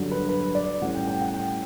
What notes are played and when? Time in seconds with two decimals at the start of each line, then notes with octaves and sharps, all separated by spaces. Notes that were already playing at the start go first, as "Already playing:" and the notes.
Already playing: G2 D3 F#3
0.11 B4
0.29 B4
0.55 D5
0.81 A2 G3 C#4 F#5
0.95 G5
1.08 G5
1.21 F#5
1.34 G5